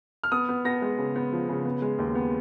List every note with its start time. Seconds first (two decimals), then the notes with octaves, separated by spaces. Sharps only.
0.24 F6
0.32 B3 D#6
0.49 B3
0.65 B3 A#6
0.82 G#3
0.98 C#3
1.16 B3
1.32 F3
1.49 C#3
1.65 B3
1.82 G#3
1.99 D#2
2.15 B3